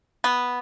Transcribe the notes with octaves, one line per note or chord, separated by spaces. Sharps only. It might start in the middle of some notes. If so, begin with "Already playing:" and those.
B3